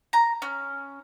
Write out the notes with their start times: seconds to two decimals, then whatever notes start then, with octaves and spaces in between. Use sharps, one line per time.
0.13 A#5
0.42 C#4